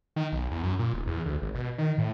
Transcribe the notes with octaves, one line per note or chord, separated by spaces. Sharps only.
D#3
B1
E2
F#2
A#2
D1
E2
D2
G#1
B2
D#3
A2